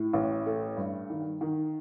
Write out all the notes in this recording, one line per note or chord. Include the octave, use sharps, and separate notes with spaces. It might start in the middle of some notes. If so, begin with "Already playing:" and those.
Already playing: A2
A1
A3
G2
D#3
D#3